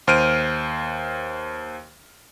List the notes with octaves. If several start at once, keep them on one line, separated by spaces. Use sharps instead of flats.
D#2 C5 F6 D7 D#7